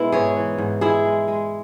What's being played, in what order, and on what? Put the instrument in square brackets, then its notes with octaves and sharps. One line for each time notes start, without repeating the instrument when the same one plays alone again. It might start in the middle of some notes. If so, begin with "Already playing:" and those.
Already playing: [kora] B2 G#3 B3 E4
G#2 G#4 C#5
E3
G#2
G#3 E4 G#4
G#3
G#3